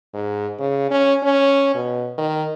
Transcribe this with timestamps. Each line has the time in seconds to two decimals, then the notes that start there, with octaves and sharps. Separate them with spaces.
0.14 G#2
0.59 C#3
0.91 C#4
1.23 C#4
1.75 B2
2.18 D#3